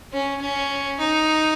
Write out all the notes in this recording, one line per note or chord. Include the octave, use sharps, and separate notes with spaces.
C#4
C#4
D#4